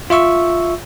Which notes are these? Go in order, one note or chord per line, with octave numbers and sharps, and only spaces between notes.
F4 E5 C#6 E6